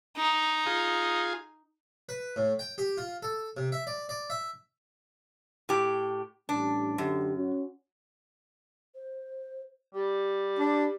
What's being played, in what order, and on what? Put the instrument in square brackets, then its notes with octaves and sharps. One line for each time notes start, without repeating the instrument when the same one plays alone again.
[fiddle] D#4
[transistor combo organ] F4 G#4
[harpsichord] B4
A2
G5
G4
F4
A4
C3
E5
D5
D5
E5
[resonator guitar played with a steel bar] A2 G4
[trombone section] A1 G3 [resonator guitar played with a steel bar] D4
[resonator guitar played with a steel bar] F#2 [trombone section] D3 G4
[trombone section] C#4 F#4
[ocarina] C5
[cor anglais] G3 [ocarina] G4
[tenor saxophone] D4